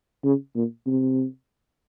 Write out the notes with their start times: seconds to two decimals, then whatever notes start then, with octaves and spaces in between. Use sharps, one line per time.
0.24 C#3
0.55 A#2
0.87 C3